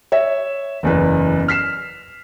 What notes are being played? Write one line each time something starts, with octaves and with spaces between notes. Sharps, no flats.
C#5 E5
F#1 E2 B4
F6 B6 C7 E7